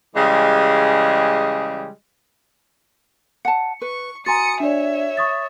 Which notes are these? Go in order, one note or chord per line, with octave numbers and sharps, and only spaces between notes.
C#3 E3 G3 G#3
F#5 A5 C#7
B4 C#6
F#4 G#5 A#5 C6 D#6 A6 C#7
D4 C#5 D5 E5
C#6 D#6 A6